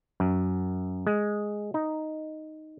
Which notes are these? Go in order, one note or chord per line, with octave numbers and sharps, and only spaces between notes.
F#2
G#3
D#4